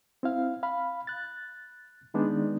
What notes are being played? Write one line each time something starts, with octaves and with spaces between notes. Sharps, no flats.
C4 E4 F5
F5 B5
F#6 A6
D#3 G#3 B3 D4 D#4 D5